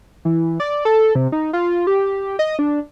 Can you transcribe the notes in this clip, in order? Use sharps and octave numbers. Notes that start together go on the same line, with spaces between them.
E3
D5
A4
C3
D#4
F4
G4
D#5
D4